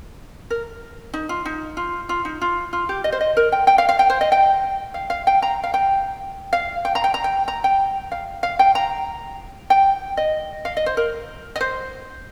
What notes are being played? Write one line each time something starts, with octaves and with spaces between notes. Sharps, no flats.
A#4
D#4
F4
D#4
F4
F4
D#4
F4
F4
G4
D#5
C5
D#5
A#4
G5
G5
F5
F5
G5
C5
D#5
G5
F5
F5
G5
A#5
F5
G5
F5
G5
A#5
G5
A#5
G5
A#5
G5
F5
F5
G5
A#5
G5
D#5
F5
D#5
C5
A#4
D#5
C5